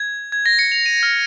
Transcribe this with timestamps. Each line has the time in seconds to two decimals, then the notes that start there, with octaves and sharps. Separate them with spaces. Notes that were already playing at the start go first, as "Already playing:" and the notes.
Already playing: G#6
0.32 G#6
0.46 A#6
0.59 C#7
0.72 F7
0.86 D#7
1.03 F6